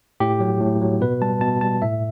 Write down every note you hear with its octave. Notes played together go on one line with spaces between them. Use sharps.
A2 G4
F#3
A2
F#3
B2 B4
G3 A5
B2 A5
G3 A5
A2 E5